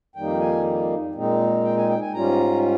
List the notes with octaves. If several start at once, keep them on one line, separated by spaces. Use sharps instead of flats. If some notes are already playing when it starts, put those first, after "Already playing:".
F2 D#3 G3 A#3 D#4 G5
G#5
A#2 G#3 C4 D#4
G5
G#5
G5
G#5
G#2 G3 C#4 F4 A#5